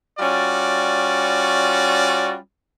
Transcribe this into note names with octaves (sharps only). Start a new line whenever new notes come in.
G3 C#4 F4 F#4 D5